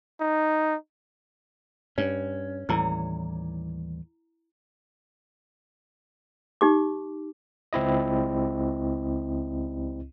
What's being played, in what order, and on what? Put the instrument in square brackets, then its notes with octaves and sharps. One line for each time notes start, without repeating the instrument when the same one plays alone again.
[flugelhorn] D#4
[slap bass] G2 [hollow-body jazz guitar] C#4
[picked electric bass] D#2 E3 G3 [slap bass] A2 [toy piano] E4 A#5 E6
[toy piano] D#4 G4 D6
[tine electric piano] C#2 C4 E4 D#5